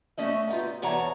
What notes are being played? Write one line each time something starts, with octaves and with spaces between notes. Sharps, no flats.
A3 C#4 D#5 E5
B3 D#4 F4
D#5
E2 C#5 F#5 A5 A#5